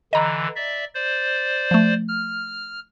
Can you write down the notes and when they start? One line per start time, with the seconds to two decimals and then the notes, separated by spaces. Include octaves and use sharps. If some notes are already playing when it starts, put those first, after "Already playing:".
0.13 D3 E3 D#5 A#5 B5
0.56 D5 E5
0.94 C5 D5
1.71 F3 A3
2.08 F6